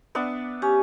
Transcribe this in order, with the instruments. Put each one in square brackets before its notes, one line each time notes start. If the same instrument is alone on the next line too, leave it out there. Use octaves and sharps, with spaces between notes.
[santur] B3 D4 E5
[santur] C#4 [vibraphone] G4